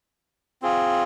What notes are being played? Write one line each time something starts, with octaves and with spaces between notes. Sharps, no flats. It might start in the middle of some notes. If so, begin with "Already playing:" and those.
C4 F4 G#4